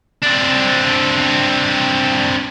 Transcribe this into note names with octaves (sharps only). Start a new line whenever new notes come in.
C4 D4